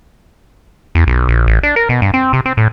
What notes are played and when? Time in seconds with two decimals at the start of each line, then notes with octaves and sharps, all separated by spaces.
0.95 E2
1.07 B1
1.28 A#1
1.47 A1
1.63 D4
1.76 A#4
1.89 B2
2.02 G2
2.14 C4
2.33 C3
2.46 C4
2.57 A2